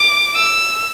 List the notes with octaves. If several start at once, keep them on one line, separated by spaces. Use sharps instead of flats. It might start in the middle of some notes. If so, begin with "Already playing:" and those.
Already playing: D6
E6